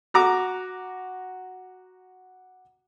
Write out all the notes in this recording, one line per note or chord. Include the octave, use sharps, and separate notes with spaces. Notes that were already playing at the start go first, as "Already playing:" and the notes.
F#4 A#5 D6